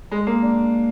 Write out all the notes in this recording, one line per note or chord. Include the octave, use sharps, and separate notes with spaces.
G#3
A#3
D4